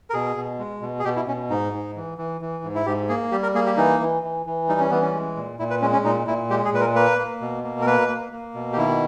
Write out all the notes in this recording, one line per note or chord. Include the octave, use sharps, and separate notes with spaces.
A#4
B2 G#4
B2
G#3
B2
G#4
B2 G4
E4
B2 C#4
G#2 D#4
G#2
E3
E3
E3
G#2
E4
G#2 G4
A#3 G#4
G3 G4
A#4
A#3 G#4
G4
E3 D#4
E3
E3
E3
G3 D#4
C#4
E3 B3
C#4
G#3
A#2
A#2 E4
B4
G#3 C#4
C#4
A#2 D#4
A#2 E4
G#3 G4
G#4
A#2 B4
A#4
A#3 B4
A#3
B2
A#3
A#4
A#3 B4
A#3
A#3
B2
G4
D#3 E4